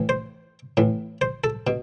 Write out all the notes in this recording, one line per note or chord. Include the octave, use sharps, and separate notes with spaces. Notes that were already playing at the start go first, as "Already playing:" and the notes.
Already playing: A2 E3
C5
A2 E3
C5
A4
B2